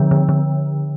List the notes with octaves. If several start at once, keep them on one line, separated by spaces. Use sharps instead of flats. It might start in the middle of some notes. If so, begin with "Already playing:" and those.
Already playing: D3 F3
D3
D3